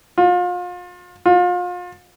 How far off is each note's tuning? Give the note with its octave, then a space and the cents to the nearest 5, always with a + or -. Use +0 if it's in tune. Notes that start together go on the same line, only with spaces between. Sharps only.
F4 +35
F4 +35